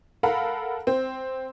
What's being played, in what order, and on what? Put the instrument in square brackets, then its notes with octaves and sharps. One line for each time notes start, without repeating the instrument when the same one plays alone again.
[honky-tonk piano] A4 A#4 F5 F#5 B5
C4